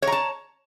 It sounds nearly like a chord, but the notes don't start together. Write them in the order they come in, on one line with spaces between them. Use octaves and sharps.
C#5 A#5 A5